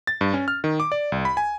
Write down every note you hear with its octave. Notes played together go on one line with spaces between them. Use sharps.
A6
G2
C#4
F6
D#3
D6
D5
C2
B5
G#5